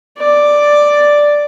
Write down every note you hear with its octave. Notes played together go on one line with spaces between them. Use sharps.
D5